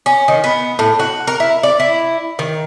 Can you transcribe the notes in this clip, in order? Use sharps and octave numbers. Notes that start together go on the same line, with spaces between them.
C#4
D#3
B3
A2
F#4
A#4
E4
D5
E4
D#3